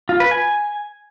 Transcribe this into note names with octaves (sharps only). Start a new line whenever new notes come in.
F4
B4
G#5